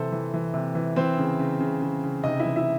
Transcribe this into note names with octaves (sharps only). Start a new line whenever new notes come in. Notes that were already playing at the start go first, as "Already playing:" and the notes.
Already playing: C3 E3 A4 C5
E3
E3
C3
E3
E3 C4 C5
C#3
C#3
C#3
C#3
C#3
C3 D#4 D#5
E4 E5
E3
E4 E5